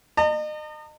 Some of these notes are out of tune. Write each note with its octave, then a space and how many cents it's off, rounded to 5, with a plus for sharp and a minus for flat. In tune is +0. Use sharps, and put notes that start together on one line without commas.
D#5 -35 A#5 -45